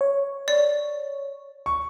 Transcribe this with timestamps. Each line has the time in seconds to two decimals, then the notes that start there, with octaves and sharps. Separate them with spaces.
0.01 C#5
0.48 D5
1.66 C#6